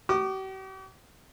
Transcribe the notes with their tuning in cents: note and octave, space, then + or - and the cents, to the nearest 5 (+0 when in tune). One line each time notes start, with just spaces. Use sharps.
G4 -45 D6 +40